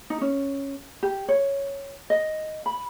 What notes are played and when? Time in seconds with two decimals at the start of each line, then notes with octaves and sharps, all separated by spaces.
0.10 D#4
0.21 C#4
1.03 G4
1.29 C#5
2.10 D#5
2.66 B5